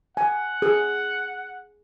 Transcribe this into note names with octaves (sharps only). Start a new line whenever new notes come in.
F#5 G#5
G#4